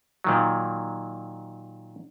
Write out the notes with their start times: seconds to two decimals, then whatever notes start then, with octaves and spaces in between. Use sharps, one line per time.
0.24 A#2 D#3 F#3